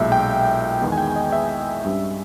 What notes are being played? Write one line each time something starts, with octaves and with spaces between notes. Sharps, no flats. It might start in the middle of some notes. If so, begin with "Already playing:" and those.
Already playing: B1 A#2 G#3 E5
G5
E2 D#3 G#3 B3
G#5
G5
D#5
E5
G2 G3 C#4